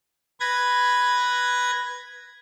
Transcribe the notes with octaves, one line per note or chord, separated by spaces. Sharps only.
B4 G#6 A#6